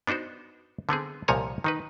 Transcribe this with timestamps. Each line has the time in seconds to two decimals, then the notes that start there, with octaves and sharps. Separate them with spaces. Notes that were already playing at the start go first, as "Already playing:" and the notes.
0.07 B3 D4 D#4 F#4 C5
0.89 D3 B3 C4 G#4
1.28 C2 A#2 F3 C#5 G#5 A#5
1.64 D#3 D#4 B4